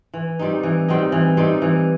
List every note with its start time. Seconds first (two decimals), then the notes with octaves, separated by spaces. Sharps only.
0.14 E3
0.39 G3 C4 D#4
0.63 E3
0.88 G3 C4 D#4
1.12 E3
1.37 G3 C4 D#4
1.62 E3